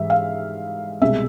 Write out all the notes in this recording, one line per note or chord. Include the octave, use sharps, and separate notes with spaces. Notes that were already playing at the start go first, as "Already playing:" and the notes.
Already playing: G#2 E3 G3 E5
F5
C2 B2 G#3 E5